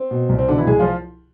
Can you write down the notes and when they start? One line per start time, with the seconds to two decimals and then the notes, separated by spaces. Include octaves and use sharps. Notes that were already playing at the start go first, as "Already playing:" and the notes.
Already playing: C4 C5
0.11 B2
0.29 C2
0.38 C4
0.48 B2 D3 D4
0.57 E3 E4
0.66 C2 G#3 G#4
0.79 F3 F4